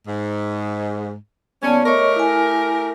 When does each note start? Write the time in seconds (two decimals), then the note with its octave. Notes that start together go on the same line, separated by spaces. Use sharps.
0.08 G#2
1.63 D#2 G3 B3 C#4 D5 A5
1.85 A3 G4 A#4 C#5 D#5 C#6
2.16 E4 G#5